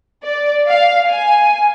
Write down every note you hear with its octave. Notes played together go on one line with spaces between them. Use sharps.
D5
F5
G#5